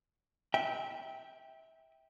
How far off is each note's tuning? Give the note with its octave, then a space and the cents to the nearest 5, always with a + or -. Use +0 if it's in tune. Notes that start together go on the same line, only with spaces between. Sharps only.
E5 -20 G5 +5